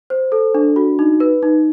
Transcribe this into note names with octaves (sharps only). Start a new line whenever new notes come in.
C5
A4
D4
F#4
D#4
B4
D#4